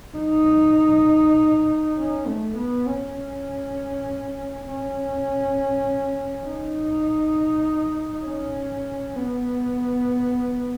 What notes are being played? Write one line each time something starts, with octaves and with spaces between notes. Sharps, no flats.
D#4
C#4
A3
B3
C#4
C#4
D#4
C#4
B3